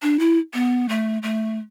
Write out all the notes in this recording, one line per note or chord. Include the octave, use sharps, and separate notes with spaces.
D4
E4
B3
A3
A3